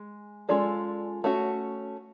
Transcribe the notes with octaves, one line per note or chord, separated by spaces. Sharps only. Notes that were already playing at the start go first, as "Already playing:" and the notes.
Already playing: G#3
G#3 C#4 F4 A4 D5
A3 C#4 F#4